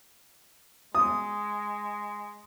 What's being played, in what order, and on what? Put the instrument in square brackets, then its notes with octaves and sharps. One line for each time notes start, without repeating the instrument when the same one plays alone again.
[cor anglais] G#3 [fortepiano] D#6